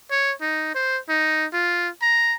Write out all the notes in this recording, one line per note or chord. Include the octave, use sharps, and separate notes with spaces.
C#5
D#4
C5
D#4
F4
A#5